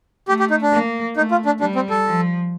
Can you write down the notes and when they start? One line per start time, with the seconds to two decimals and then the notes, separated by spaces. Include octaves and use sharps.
0.28 A3 G4
0.40 G4
0.51 D#4
0.62 D4
0.72 A#3
1.16 A3 D#4
1.31 F4
1.46 D4
1.60 G3 D4
1.76 C4
1.90 A4
2.05 F3